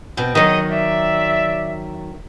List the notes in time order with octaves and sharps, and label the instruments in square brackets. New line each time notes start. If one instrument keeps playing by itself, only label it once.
[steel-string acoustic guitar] B2 C4
[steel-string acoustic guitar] D#3 F#3 [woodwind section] G#4 C#5 D#5
[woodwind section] D5 E5